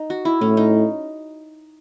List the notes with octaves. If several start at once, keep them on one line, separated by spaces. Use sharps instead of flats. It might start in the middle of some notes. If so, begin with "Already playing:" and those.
Already playing: D#4
F#4
E4
A2 C#4
D#4